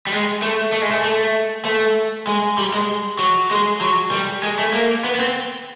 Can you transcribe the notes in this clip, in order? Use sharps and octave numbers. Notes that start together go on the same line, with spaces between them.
G3
G#3
A3
A3
G#3
A3
A3
A3
G#3
G3
G#3
F#3
G#3
F#3
G3
G#3
A3
A#3
B3
B3
C4